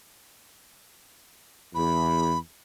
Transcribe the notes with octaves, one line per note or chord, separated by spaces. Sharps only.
E2 B5